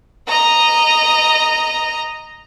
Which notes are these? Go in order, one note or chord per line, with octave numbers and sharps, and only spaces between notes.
D#5 A#5